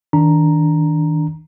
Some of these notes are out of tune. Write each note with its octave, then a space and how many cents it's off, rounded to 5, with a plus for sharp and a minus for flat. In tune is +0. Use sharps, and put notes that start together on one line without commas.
D#3 +30 D4 -5 A#5 +0